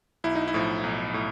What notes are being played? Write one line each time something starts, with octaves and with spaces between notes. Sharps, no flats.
B1 E4
D#4
E4
A2 F3
B1
A2